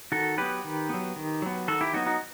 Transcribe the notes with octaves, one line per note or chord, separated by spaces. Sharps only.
D#3 F#4 A4
F#3 B3 G4 B4
D#3
F#3 B3
D#3
F#3 B3
D#3 F#4 A4
E4 G4
F#3 B3 D#4 F#4
D#4 F#4